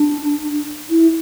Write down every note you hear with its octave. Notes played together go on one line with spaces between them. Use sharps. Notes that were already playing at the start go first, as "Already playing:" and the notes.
Already playing: D4
E4